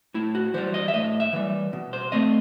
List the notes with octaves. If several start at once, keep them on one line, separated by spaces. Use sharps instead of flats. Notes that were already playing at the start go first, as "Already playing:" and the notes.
A2 E4
F#4
E3 G3 C5
D#5
E5
A2 D#5
E5
E3 G3
B2
C5
A3 C4 D#5